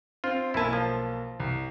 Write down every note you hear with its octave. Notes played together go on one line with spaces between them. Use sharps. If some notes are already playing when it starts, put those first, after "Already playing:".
C4 F4
B1 A#3 E4 G#5 A5
F3
C2